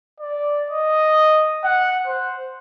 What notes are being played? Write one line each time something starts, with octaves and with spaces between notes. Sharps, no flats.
D5
D#5
F#5
C5